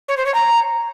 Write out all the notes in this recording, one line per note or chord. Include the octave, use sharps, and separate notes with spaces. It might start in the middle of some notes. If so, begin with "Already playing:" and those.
C#5
C5
C#5
A#5